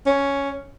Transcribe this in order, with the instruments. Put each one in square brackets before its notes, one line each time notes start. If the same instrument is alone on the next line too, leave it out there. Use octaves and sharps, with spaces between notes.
[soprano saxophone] C#4